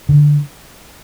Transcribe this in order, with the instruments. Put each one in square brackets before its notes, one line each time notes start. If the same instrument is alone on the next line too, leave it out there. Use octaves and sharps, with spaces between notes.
[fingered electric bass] D3